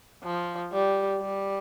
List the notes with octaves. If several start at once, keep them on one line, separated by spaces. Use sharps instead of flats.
F3
G3
G3